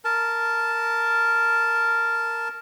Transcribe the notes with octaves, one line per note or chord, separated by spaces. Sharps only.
A#4 A5